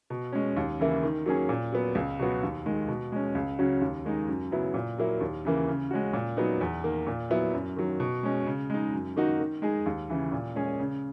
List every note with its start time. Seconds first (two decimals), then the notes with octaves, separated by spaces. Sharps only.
0.10 B2
0.33 G#3 C#4
0.56 D#2
0.80 C#3 E3 A#3 E4
1.03 D#3
1.26 F#3 A#3 C#4 G#4
1.49 A#2
1.72 F#3 B3
1.95 C#2
2.19 B2 F#3 B3 F#4
2.43 D#2
2.66 D#3 G#3
2.88 B2
3.12 G#3 C#4
3.35 C#2
3.59 C#3 F#3 C#4 F#4
3.81 D#2
4.05 D#3 G#3 D#4
4.28 F#2
4.51 C#3 F#3 B3 E4
4.74 A#2
4.98 F#3 A#3 E4
5.21 D#2
5.45 C#3 E3 A#3
5.68 C#3
5.91 G#3 C#4 F#4
6.13 A#2
6.37 F#3 B3 D#4
6.61 E2
6.84 D#3 A#3
7.07 A#2
7.30 F#3 B3 E4
7.54 F#2
7.77 D#3 F#3
8.00 B2
8.23 G#3 C#4
8.46 C#3
8.70 G#3 D#4
8.93 F#2
9.16 D#3 A#3 D#4 F#4
9.40 D#3
9.62 G#3 D#4 G#4
9.86 D#2
10.10 C#3 E3
10.32 A#2
10.55 G#3 C#4 G#4
10.79 C#3